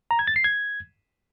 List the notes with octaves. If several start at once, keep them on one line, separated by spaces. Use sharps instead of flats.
A#5
G#6
A6
C7
G#6